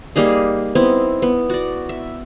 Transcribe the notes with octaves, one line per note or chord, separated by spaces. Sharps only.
G3 A#3 D#4 G#4
B3 C4 D#4 E4
B3
F#4 D5
E5